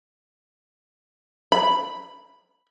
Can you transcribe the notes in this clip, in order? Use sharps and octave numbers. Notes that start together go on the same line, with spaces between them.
B5